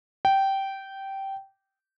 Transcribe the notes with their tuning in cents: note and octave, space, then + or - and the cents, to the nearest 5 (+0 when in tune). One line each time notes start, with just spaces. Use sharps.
G5 -15